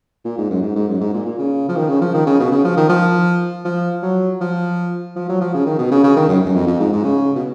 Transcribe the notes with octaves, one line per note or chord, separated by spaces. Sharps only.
A#2
G#2
F#2
G#2
G#2
F#2
G#2
A#2
A#2
C#3
F3
D#3
C#3
F3
D#3
C#3
B2
C#3
F3
D#3
F3
F3
F#3
F3
F3
F#3
F3
C#3
D#3
B2
C#3
C#3
D#3
F#2
F#2
F2
F2
G#2
G#2
C#3
B2